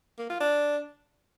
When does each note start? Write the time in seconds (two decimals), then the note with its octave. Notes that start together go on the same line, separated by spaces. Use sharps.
0.19 A#3
0.30 F4
0.41 D4